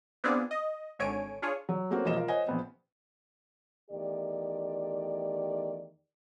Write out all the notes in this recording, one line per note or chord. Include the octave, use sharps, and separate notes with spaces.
B3 C4 D4 F4 G#4 D5
D#5
G#1 D3 C#5 G#5 D7
D4 F4 G#4 C#5
F#3
A3 A#3 C4 C#4 F#4
E1 F3 A#3 C5 D#5 E7
F4 A#4
C5 C#5 D#5 F#5 G#5
A#1 B3 C4
E2 D#3 A3 G4 D5